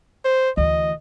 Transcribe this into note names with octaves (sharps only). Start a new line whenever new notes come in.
C5
D2 E3 D#5